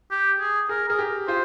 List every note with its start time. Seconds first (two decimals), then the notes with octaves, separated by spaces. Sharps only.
0.11 G4
0.40 G#4
0.69 G#4 A#4
0.89 G#4 A#4
0.99 G4
1.28 F4 C5